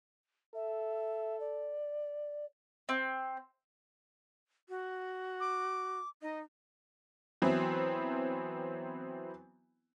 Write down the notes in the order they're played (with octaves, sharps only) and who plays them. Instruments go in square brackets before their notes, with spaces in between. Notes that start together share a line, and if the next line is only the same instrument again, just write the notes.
[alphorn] A4 [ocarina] E5
[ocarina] D5
[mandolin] C4
[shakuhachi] F#4
[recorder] D6
[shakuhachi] D#4 [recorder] D#5
[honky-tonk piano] E3 F#3 B3 C4 E4